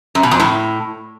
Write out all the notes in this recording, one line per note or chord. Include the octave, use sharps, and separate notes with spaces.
F#2
B2
F2
A2